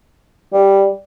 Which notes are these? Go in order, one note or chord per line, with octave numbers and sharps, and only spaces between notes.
G3